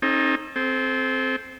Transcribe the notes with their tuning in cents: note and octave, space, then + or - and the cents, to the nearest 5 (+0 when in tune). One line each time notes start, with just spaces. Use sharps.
C4 +45 D#4 +0 A4 -15
C4 +0 A4 -35